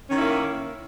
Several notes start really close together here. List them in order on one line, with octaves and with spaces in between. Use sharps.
C#4 D#3 E4 A#3